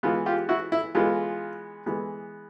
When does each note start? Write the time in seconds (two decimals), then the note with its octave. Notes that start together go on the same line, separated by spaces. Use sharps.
0.03 E3 G#3 B3 F4
0.26 F4 G4
0.49 E4 F#4
0.72 E4
0.95 E3 G#3 B3 F4
1.86 E3 G#3 B3